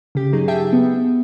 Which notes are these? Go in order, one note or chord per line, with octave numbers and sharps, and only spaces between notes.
C#3 G4
G1 F#3 D#4 G#4
G4 G#4 E5 G5 A5
B3